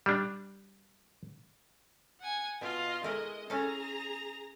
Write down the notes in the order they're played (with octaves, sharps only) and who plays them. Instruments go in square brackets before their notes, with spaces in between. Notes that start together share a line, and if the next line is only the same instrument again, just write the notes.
[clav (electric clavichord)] G3 D4
[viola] F#5 G#5
[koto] B2 [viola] F4 D#5
[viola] G#3 D#5 [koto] A3 E4 A#4
[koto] C#4 E4 A4 [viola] G#4 A#5